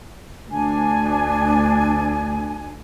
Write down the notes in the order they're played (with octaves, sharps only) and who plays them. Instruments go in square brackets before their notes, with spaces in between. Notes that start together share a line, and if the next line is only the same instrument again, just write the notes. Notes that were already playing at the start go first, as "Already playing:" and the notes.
[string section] D2 [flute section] D4 G#5